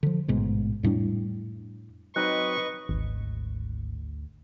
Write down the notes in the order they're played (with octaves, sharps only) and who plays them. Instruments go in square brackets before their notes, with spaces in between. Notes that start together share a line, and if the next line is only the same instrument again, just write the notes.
[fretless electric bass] D3 F3
A1 G#2 B2
F2 A2 G3 D4
[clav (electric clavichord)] F#3 C4 D#4 [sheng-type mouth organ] B4 D#5 [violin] C#6 [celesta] F#6
[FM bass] G#1 [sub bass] D2